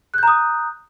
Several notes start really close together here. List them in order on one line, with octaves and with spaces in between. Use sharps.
F#6 G6 A#5 D#6